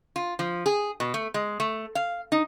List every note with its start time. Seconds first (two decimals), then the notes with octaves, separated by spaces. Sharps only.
0.16 F4
0.39 F3
0.66 G#4
1.00 B2
1.14 A3
1.34 G#3
1.60 A3
1.95 F5
2.32 D#4